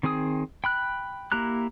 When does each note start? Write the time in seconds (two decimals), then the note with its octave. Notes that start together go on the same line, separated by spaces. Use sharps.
0.03 D#3 C4 G#4 G#5 D#6
0.64 G5 B5 F#6
1.32 A#3 E4 G4 A#5 F#6